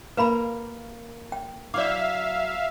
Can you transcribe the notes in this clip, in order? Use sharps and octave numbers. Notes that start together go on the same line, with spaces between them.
A#3 A#4 B4 F5 B5
G5
F#3 E4 D5 E5 F5 D6